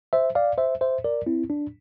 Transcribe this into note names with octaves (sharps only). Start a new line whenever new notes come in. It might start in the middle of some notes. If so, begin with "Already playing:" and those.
C5 E5
D5 F5
C5 E5
C5 E5
A#4 D5
C4 E4
D4